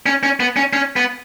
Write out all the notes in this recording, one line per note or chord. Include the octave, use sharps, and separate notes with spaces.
C#4
C#4
B3
C#4
C#4
B3